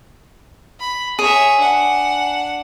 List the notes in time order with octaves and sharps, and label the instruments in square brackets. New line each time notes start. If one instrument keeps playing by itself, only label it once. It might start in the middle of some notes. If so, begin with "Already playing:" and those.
[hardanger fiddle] B5
[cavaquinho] G#4 [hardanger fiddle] C#5 E5
[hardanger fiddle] D4 F#5